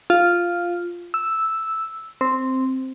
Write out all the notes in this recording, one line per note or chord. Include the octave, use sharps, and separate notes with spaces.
F4
E6
C4